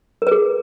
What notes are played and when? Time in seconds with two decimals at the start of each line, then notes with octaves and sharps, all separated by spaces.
0.22 A#4
0.27 B4
0.31 G#4